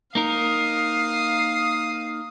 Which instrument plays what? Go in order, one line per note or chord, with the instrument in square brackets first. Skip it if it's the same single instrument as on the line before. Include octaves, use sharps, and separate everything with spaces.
[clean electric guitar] A#3 D#4 A#4 [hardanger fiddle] F5 [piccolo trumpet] D#6